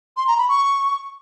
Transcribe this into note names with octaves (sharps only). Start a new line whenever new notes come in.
C6
A#5
B5
C#6